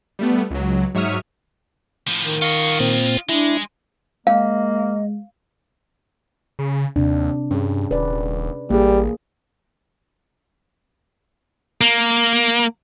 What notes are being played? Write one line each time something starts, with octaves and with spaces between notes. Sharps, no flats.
G3 A3 B3
C#2 F#3
G#2 F#3 E5 C#6 D#6 F6
A2 F3
D#3
F4 D#5 F5 C#6
A#2 C4
G#3 D4 E4
G#3 A#3 D#5 F5
C#3
D#2 C3 D4
G2 C#4 G#4
D#1 B4 D5
A1 G3 A#3 G#4
A#3